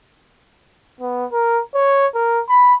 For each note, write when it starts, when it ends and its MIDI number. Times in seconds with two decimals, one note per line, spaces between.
1.01 1.26 59
1.32 1.60 70
1.74 2.07 73
2.15 2.41 70
2.49 2.75 83